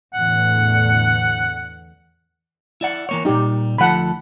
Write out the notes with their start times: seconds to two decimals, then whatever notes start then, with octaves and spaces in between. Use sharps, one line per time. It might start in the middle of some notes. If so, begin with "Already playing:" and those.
0.14 E2 A2 D3 F#5
2.81 E4 D5 F#5
3.09 E3 A#3 C#5
3.25 A#2 G3 D#4 G4
3.78 D2 F3 A4 F#5 B5